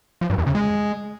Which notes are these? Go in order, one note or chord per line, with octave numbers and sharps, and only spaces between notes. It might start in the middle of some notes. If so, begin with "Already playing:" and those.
F3
G2
E2
C#3
G#3